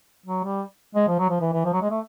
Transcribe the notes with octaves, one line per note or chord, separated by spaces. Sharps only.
F#3
G3
G#3
F3
F#3
F3
E3
E3
F3
F#3
G#3
A3